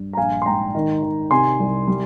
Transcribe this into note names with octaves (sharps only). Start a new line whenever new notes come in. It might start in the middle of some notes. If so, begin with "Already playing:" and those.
Already playing: G2
A#5
A#1 F5 G#5
C6
G#2 G5 A#5
D#3
D#3
C3 G#5 C6
C2
G3